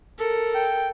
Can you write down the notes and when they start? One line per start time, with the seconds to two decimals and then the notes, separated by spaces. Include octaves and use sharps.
0.18 A4 A#4
0.55 G5